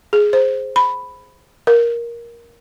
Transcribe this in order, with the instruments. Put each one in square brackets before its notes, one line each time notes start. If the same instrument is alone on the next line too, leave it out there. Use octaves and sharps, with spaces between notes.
[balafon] G#4
C5
B5
A#4